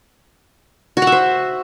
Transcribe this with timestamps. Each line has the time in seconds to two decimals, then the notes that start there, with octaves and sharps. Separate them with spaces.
0.97 F#4
1.02 F#5
1.07 E5
1.12 C5